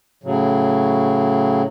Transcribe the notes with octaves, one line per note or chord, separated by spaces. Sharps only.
A2 C#3 F#3